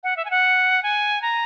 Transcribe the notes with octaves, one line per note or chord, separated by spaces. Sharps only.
F#5
E5
G#5
F#5
G#5
A#5